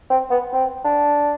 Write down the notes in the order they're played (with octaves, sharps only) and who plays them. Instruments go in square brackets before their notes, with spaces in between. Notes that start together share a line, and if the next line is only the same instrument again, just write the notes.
[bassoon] C4
B3
C4
D4